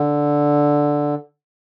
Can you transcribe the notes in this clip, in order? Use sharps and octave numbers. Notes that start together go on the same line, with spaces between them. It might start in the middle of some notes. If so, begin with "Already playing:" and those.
Already playing: D3